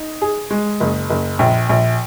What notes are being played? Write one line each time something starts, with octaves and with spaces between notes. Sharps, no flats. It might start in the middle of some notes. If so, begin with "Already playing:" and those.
Already playing: D#4
G#4
G#3
F#1
F#1
A#1
A#1